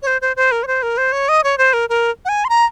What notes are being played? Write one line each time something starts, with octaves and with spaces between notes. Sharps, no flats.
C#5
C5
C5
C5
A#4
C#5
C5
A#4
C5
C#5
D#5
C#5
C5
A#4
A#4
F#5
G#5
C6
A#5